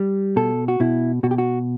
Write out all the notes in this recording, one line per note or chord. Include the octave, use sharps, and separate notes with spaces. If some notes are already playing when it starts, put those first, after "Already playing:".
Already playing: G3
B2 A4
F#4
B2 E4
B2 F#4
G4
F#4